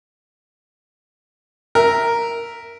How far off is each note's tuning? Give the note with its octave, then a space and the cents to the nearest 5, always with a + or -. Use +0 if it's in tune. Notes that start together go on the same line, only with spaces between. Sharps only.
A#4 +0 E5 +0